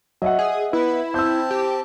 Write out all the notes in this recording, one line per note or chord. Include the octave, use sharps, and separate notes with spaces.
F#3 D#5 E5 F#5
G#4
B3 E4 B4
C4 C5 A5 E6 G6
G4